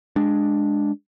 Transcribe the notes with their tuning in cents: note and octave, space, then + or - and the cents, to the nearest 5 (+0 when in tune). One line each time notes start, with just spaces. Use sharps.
G#3 +0 D4 +0